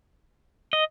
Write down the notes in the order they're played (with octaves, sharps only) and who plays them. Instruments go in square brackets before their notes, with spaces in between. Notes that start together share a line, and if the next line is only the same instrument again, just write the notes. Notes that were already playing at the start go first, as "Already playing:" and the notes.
[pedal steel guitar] D#5